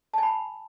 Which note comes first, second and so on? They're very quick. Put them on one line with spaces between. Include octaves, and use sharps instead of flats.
A5 G#5 B5